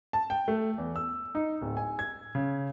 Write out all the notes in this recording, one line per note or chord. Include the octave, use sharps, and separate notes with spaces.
A5
G5
A3
E2
E6
D#4
D1
G#5
G#6
C#3